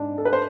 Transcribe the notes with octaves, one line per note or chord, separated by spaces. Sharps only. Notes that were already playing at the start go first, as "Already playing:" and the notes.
Already playing: G#2 D4
A4
B4
C5